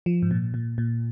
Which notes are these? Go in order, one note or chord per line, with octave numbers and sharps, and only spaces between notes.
F3
G#2
A#2
A#2
A#2